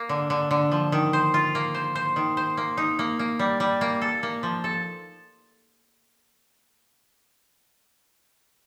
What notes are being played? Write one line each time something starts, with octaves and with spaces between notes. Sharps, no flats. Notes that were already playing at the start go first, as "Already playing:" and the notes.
Already playing: A#3
D3
D3
D3
F3
D#3
C5
F4
A#3
C5
C5
D#3
C5
A#3
D#4
A#3
A#3
G3
G3
A#3
A4
A#3
F3
A4